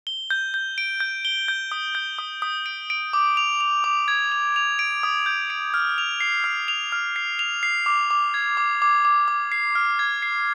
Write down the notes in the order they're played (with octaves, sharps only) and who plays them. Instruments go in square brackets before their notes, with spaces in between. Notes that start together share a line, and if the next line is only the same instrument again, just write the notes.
[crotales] G7
G6
G6
D7
G6
G7
G6
D#6
G6
D#6
D#6
D7
D7
D6
F7
F7
D6
G#6
F7
F7
D7
D#6
G6
D7
F6
F7
C7
F6
F7
F6
C7
F7
C7
D6
D6
G#6
D6
D6
D6
D6
C7
F6
G#6
C7